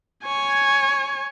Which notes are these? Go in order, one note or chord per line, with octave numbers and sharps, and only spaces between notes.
C#5 G#5